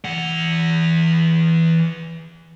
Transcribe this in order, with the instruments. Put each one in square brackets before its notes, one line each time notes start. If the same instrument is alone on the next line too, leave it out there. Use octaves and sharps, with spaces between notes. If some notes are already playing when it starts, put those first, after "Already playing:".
[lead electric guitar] E3 F#5